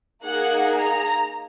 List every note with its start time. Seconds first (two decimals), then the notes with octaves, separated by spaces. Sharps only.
0.25 A#3 D#4 G#4 F#5
0.78 A#5